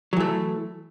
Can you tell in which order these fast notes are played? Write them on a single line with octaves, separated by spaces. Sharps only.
F#3 E3 A3